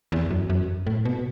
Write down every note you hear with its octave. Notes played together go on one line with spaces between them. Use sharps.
E2
F#2
F#2
A2
B2